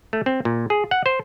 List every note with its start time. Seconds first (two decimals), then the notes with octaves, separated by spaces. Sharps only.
0.13 A3
0.26 C4
0.45 A#2
0.70 G#4
0.91 F#5
1.06 C5